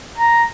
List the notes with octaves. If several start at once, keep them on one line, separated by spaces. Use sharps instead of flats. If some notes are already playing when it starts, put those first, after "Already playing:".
A#5